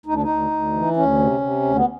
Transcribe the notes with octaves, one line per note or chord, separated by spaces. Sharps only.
D2 D#4
D4
D#4
D2
D2
E3
D2 C#4
C3
C3
D2
B3